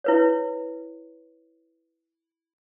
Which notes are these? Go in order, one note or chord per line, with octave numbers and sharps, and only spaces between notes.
E4 B4 C#5